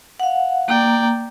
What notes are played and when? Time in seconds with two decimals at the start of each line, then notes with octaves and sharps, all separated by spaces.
0.20 F5 F#5
0.68 A#3 D5 G5 A#5